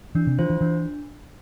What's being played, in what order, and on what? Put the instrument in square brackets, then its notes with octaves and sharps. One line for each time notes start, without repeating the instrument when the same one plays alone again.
[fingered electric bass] E3 [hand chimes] D4
[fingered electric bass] C3
[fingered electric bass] E3 [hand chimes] F4 C5
[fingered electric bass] E3
[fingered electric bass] E3 [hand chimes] D4